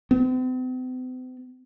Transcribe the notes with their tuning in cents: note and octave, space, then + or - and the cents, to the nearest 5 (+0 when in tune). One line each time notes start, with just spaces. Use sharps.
C4 -45